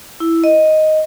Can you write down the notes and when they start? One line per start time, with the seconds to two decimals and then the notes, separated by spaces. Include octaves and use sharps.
0.20 E4
0.44 D#5